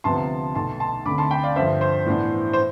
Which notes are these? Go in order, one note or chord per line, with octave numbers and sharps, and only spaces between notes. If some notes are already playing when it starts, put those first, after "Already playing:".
D2 C3 F3 B3 A5 C6
B1 B2 A3 A5 C6
A5 C6
D2 D3 A3 C4 B5 D6
A5 C6
G5 B5
D5 F5
G2 D3 F3 C5 E5
C5
A2 E3 B3 D4
C5